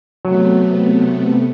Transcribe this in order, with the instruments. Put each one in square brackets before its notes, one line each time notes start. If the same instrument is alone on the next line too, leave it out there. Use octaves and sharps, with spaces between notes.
[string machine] C3 A3 B3 [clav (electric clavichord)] F#3